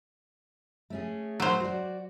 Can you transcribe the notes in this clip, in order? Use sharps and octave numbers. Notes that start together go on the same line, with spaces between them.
A3 C#4 G#4
F#3 C5
F#4 D5